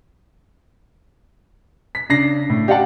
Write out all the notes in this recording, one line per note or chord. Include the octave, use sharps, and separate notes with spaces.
B6
C#3 D4 A#6 C7
A2
G4 D5 F5 F#5 A5